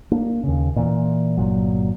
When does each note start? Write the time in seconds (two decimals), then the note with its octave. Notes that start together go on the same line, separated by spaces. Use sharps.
0.12 A#3 D4
0.44 D#2 C#3
0.76 A#2 E3
1.37 G1 A#2 F#3